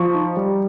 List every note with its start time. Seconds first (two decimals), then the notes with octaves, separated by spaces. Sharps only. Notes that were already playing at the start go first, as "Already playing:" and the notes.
Already playing: F3 C#6
0.14 D#4
0.37 G3